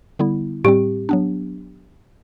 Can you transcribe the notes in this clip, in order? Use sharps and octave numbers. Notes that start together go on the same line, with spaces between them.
D3 G3 B3 E4
A2 G3 C4 G4
F#3 B3 D4